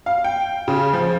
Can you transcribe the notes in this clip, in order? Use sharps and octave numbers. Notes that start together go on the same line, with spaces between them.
F5
G5
C#3
F3